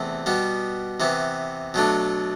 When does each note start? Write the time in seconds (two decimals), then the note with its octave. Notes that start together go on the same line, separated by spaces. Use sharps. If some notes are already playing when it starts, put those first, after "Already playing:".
Already playing: E2 C3 E3 A3 C4
0.26 B2 G3 B3
1.00 C3 E3 B3
1.74 B2 F#3 A3 D4